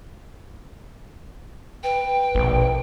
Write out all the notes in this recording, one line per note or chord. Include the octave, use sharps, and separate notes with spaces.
B4 G5
A#1 B2